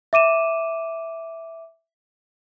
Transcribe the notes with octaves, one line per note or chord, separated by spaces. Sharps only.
E5 D6 D#7 E7